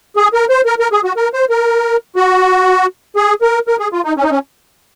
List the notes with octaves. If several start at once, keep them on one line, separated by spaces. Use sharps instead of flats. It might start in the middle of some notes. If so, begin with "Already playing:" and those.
G#4
A#4
C5
A#4
A#4
G#4
F#4
A#4
C5
A#4
F#4
G#4
A#4
A#4
G#4
F4
D#4
C#4
D#4
C#4